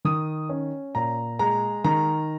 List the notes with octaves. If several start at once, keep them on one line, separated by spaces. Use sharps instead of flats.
D#3 D#6
C#4
A#2 A#5
G#3 A#5
D#3 A#5